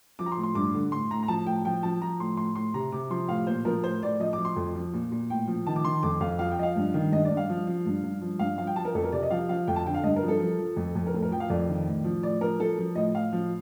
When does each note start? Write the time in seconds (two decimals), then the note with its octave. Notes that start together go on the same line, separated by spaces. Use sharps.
0.19 F3 D6
0.26 A#5
0.32 C6
0.37 A2
0.43 C6
0.55 G2 D6
0.74 D3
0.92 A2 C6
1.11 A2 A#5
1.23 A#5
1.28 F3 A5
1.46 A2 G5
1.65 F3 G5
1.83 F3 A5
2.01 F3 A#5
2.20 A2 C6
2.37 A2 C6
2.56 A2 C6
2.74 C3 A#5
2.92 C3 D6
3.10 F3 C6
3.28 A2 F5
3.47 A#2 C5
3.65 F3 A#4
3.84 A2 C5
4.02 A2 D5
4.20 F3 D#5
4.33 D6
4.38 F3
4.45 C6
4.56 F2
4.75 F3
4.94 A#2
5.12 A#2
5.30 A2 G5
5.47 F3
5.67 D#3 A5
5.76 D6
5.85 D#3 C6
6.03 F2 D6
6.20 F2 F5
6.39 F3 F5
6.52 G5
6.58 F3 D#5
6.63 F5
6.76 G2
6.94 D#3
7.12 G2 D#5
7.25 D5
7.31 G2
7.37 F5
7.49 F3
7.67 F3
7.86 G2
8.04 G2
8.21 F3
8.39 G2 F5
8.58 F3 F5
8.67 G5
8.76 F3 A5
8.85 A#4
8.95 F2 A4
9.04 A#4
9.12 C3 D5
9.23 D#5
9.31 F3 F5
9.49 F3 F5
9.67 F2 G5
9.76 A5
9.86 D3 G5
9.94 F5
10.03 G2 D#5
10.16 A#4
10.23 F3
10.28 A4
10.40 F3
10.59 F3
10.77 F2
10.95 F2
11.06 A#4
11.13 A2 A4
11.22 A#4
11.31 F3 G5
11.40 F5
11.50 F2 D5
11.69 D#3
11.87 A2
12.04 F3
12.23 A2 D5
12.41 F3 A#4
12.59 F3 A4
12.78 F3
12.95 A2 D#5
13.14 A2 F5
13.33 F3